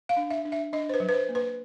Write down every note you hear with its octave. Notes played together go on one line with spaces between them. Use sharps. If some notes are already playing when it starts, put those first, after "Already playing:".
F5
D4
E5
D4
E5
D4 D#5
C5
B4
F#3
B4
C5
A#3
B4